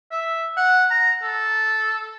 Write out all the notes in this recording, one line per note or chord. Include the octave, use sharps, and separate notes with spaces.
E5
F#5
A#5
A4